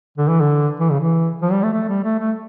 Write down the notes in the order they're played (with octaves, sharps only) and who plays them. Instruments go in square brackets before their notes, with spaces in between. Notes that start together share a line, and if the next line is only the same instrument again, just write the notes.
[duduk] D3
E3
D3
E3
C#3
E3
F3
G3
A3
A3
G3
A3
A3